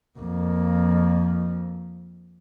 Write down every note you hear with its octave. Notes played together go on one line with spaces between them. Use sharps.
F2 A#3